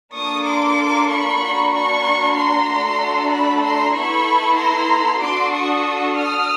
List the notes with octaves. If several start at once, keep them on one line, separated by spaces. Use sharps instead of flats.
A#3 D4 F4 A4 C#6 D#6
C6 D6
B5 C#6
A#3 D4 F#4
B5 C#6
A#5 C6
A3 D4 F#4 A4
A5 B5
A#5 C6
B3 E4 A4 B5 C#6
A#5 C6
D4 F#4 A4 C6 D6
C#6 D#6
D#6 F6